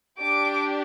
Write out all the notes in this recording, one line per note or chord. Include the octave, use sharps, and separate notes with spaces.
D4 G4 D6